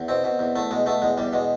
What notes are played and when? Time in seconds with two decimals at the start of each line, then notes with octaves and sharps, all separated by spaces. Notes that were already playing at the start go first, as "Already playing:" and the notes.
Already playing: E2
0.08 B2 C4
0.24 B2
0.39 E2
0.56 E2 A3
0.71 B2 G#3
0.86 B2 A3
1.02 E2 G#3
1.18 E2 G3
1.33 B2 G#3